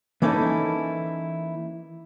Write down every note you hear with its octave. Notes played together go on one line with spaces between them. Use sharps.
E3 A#3 C#4 D#4 E4 A4